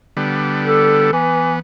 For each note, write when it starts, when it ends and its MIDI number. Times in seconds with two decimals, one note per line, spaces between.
0.17 1.11 50
0.17 1.11 55
0.17 1.11 59
0.65 1.10 69
1.13 1.57 52
1.13 1.60 59